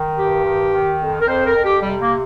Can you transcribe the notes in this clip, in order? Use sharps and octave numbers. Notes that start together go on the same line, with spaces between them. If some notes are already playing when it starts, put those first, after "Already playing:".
Already playing: D#3
G2 G4
D#3
D#3
F2
A#4
F2 C5
A#4
F2
G4
C3 G3
A#3